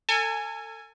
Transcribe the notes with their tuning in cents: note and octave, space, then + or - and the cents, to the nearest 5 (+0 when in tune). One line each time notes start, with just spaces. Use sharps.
A4 +35 G#5 +0